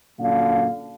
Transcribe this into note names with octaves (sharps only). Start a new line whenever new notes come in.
F#2 A#2 D3 F5